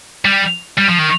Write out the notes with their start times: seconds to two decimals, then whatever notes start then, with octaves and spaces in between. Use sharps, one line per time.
0.25 G3
0.78 G3
0.88 F3
0.98 D#3